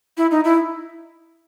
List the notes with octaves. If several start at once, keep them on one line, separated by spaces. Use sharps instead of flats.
E4
D#4
E4